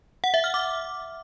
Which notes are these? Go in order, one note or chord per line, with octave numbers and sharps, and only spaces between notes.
F#5
E5
F6
D6